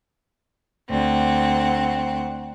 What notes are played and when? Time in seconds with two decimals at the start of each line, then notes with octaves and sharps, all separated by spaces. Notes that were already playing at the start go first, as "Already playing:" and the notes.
0.89 D2 C4 F#5